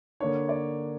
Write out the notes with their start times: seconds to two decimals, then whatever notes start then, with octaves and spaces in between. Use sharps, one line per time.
0.20 D3 A#3 D4 C#5
0.49 D5